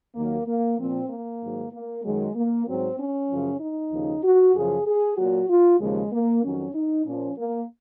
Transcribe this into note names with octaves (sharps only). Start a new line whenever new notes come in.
D#2 D#3 F#3 A#3
A#3
A#2 F3 C4
A#3
G#2 D#3 F#3
A#3
F#2 D#3 F#3 G#3
A#3
G#2 F#3 C4
C#4
F#2 C#3 F3
D#4
D#2 C#3 F3
F#4
F#2 C#3 F3 G#4
G#4
A#2 F#3 F#4
F4
D#2 C#3 F3 G#3
A#3
F2 D#3 F#3 C#4
D#4
A#2 F3 C#4
A#3